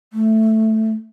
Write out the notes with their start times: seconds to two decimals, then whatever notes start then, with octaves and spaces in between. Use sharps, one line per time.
0.13 A3